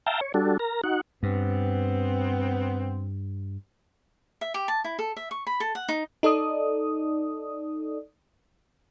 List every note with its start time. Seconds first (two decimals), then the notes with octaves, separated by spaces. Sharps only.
0.06 E5 F5 G5 A5 A#5
0.21 C#5
0.34 G3 D4 F#4 A4
0.59 A#4 A#5
0.84 D#4 F#4 F#5
1.23 G2 B3 C4
4.41 E5
4.54 G4
4.68 A5
4.84 E4
4.99 A4
5.17 E5
5.31 C#6
5.47 B5
5.60 A4
5.75 F#5
5.89 D#4
6.23 D#4 A4 D5 D#6